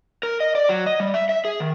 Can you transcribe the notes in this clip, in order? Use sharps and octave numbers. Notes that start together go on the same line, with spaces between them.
A#4
D#5
D5
F#3
D#5
G3
E5
E5
G#4
D#3